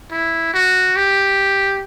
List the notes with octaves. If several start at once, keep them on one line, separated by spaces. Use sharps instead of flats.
E4
F#4
G4